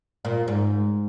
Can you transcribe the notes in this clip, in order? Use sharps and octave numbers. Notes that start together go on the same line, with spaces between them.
A#2
G#2